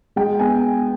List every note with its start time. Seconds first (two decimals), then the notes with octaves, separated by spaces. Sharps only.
0.16 G#3 G5
0.39 B3 G#5